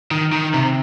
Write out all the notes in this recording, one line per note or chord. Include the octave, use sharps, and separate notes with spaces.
D#3
D#3
C3